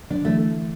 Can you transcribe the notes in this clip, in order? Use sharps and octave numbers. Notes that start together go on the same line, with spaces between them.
D3 D4
E3 A3